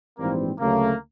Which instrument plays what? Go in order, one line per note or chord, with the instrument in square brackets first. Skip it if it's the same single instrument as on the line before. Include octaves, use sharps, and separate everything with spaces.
[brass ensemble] A#1 G#2 E3 G3 C4 [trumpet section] A#3
[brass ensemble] D2 C#3 F#3 A3 [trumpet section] A#3